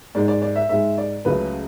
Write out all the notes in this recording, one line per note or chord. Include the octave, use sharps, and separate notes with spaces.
G#2 G#3 D5
D5
D5
E5
G#2 G#3 E5
D5
C#2 C#3 F#3 A3 B4